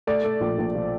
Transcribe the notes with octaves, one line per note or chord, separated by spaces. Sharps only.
A3 D5
A3
A#1
A#1
F3